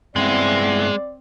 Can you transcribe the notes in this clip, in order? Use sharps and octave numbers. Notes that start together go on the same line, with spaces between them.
G2 G#3 B3 C4 E4 D5